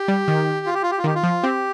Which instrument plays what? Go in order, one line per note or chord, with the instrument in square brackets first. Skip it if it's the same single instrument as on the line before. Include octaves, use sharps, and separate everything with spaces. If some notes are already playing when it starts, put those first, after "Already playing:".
Already playing: [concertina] G4
[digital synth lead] G3
D#3
[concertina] F4
G4
F4
G4
F4
[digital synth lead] D#3 [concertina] G4
[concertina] F4
[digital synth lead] F3
[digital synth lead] C4 [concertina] G4